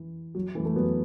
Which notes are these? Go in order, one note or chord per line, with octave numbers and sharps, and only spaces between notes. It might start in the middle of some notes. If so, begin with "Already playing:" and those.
Already playing: E3
F#3
E3 A3
A3
F#3 B3